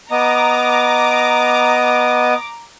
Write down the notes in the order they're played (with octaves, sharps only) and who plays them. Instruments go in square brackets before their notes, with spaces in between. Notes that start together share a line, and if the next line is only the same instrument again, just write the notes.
[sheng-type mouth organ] B3 D#5 [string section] A#5 D6